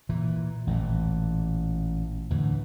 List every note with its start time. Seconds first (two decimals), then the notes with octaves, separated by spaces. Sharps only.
0.09 A#2 E3
0.67 A1 A#2 D3 E3
2.30 D2 A2 E3